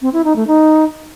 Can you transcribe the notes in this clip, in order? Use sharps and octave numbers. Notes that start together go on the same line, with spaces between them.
C4
E4
D#4
A3
D#4